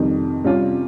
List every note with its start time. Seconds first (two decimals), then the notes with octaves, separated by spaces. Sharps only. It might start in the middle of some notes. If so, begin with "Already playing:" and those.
Already playing: F2 C3 D#3 G3
0.44 C3 G3 C#4 F4